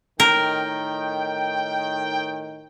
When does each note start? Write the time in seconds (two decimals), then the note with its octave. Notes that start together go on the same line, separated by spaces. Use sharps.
0.20 A2 D#3 A#4 G5